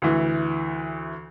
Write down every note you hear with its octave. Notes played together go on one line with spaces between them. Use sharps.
D2 E3